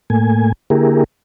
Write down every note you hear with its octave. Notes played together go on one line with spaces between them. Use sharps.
A2 A3 A#3 G#5
D3 A#3 E4 G4 G#4 A#4